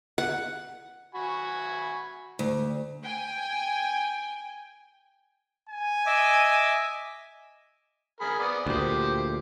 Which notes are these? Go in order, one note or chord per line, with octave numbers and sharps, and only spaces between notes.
F#5
F#4 G#5 B5
D2
G5 G#5
G#5
D#5 E5 D6
G#4 A#4 B5
B3 D5 D#6
D2 A#2 G4 C5